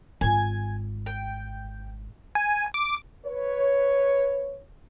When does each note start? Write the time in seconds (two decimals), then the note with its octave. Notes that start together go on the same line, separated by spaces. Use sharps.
0.21 G#1 F4 G#5
1.06 G5
2.35 G#5
2.74 D6
3.26 B4 C#5